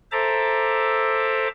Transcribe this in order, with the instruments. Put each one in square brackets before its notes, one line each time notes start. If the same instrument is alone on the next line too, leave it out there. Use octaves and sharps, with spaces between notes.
[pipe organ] A4 C5 E5 A5 A#5 D6